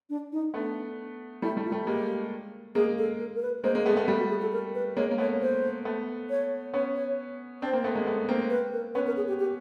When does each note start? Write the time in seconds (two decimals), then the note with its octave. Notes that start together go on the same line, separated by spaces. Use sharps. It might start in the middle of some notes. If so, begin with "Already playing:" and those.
0.10 D4
0.32 D#4
0.54 A3 B3 D4
1.42 G3 A3 E4
1.57 G3 A3
1.65 F4
1.72 G3 A3
1.86 G#3 A#3 G4
2.75 G#3 A#3 G#4
2.98 A4
3.19 A#4
3.35 A#4
3.42 B4
3.64 G#3 A#3 C5
3.75 G#3 A#3
3.86 A3 B3 G#4
3.97 A3 B3
4.07 G3 A3 G4
4.19 F#4
4.30 G#4
4.42 A4
4.52 A#4
4.75 B4
4.97 G#3 A#3 C#5
5.11 A#3
5.18 A3 B3 C#5
5.41 C5
5.85 A3 B3
6.30 C#5
6.74 B3 C#4 C#5
6.96 C#5
7.62 C4 D4 C5
7.73 A#3 C4
7.84 A3 B3
7.95 G#3 A#3
8.07 A3 B3
8.29 A#3 C4
8.50 B4
8.73 A#4
8.95 B3 C#4 B4
9.07 A#4
9.17 G#4
9.28 G4
9.39 G4